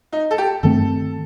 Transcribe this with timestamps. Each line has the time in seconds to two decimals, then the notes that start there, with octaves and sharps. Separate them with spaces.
0.13 D#4
0.31 A4
0.38 G4
0.63 G2 D#3 A3 C4 A4